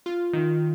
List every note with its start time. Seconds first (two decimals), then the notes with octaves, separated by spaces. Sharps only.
0.06 F4
0.33 D#3